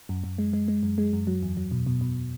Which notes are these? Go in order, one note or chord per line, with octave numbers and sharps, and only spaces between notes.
F#2
F#2
G#3
G#3
G#3
F#2
G#3
F#2
F#3
E2
F#3
B2
B2
B2